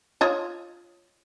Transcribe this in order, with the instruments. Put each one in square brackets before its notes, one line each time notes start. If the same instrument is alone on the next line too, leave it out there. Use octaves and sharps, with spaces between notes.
[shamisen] F4 C#5 D#5